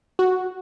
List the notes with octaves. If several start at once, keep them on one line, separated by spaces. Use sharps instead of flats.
F#4